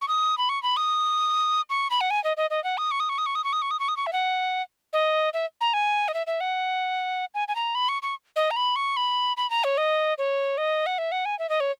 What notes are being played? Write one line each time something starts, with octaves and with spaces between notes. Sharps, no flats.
C#6
D#6
B5
C#6
B5
D#6
C#6
B5
F#5
G#5
D#5
D#5
D#5
F#5
D#6
C#6
D#6
C#6
D#6
C#6
D#6
C#6
D#6
C#6
D#6
C#6
D#6
C#6
E5
F#5
D#5
E5
A#5
G#5
D#5
E5
E5
F#5
G#5
G#5
A#5
B5
C#6
C#6
D#5
A#5
B5
C#6
B5
B5
A#5
C#5
D#5
C#5
D#5
F#5
E5
F#5
G#5
E5
D#5
C#5